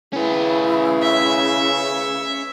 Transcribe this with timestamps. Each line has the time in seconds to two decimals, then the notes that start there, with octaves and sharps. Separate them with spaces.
0.13 C#3 C#4 E4 B4
1.02 C#5 E5